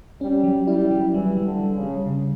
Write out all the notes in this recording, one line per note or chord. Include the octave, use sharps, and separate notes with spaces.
G3 C#4
F#3
G3 E4
F#3
E3 G3
G3
D3
G3
C#3
G3
C#3